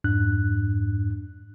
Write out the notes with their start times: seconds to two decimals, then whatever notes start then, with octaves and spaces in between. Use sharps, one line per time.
0.04 F2 G#2 D4 F#6